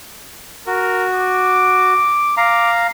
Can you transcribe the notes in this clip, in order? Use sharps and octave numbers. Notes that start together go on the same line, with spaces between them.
F#4 A#4
D6
F5 A#5 D6